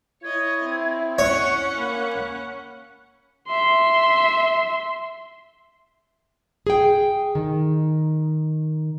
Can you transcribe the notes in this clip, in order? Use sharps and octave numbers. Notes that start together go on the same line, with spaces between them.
E4 C#5 D#5 G#6
C4
C#4 C#5 F#5 C#7
A#3 B5
E5 C6
G#4 G5
D#3